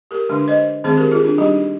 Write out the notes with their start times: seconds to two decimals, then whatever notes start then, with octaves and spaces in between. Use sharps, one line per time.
0.11 G4 A#4
0.29 D3 G#3 D4
0.48 C5 D#5
0.84 D#3 G#3 C4 G#4 C5
0.97 G4 A#4
1.12 F4 G#4
1.25 D4 F4
1.38 G3 D4 D#4 G4